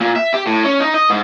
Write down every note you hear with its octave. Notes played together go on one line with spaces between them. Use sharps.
A#2
E5
G4
A2
C#4
D#4
D#5
G#2